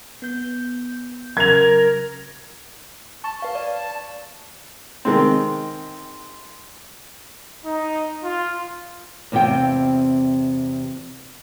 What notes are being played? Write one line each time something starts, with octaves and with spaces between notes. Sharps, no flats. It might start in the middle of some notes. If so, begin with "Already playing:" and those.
B3 G6
C#3 F#3 A#4 G#6 F7
A5 C#6
B4 F5 C#6
D5
D#3 G#3 C4
D#4
F4
E2 C3 C4 F4 G5